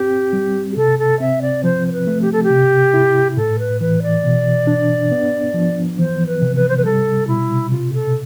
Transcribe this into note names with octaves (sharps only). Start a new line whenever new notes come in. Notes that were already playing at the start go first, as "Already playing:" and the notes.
Already playing: C4 G4
G3
G4
C3 A4
A4
C4 E5
D5
F3 C5
C5
B4
A3
G4
A4
G4
C3
E4
A2 A4
B4
E3 B4
D5
B2
D4
B3
F3
E3 C5
B4
C3
B4
C5
B4
G3 A4
B2 E4
C3 F4
A4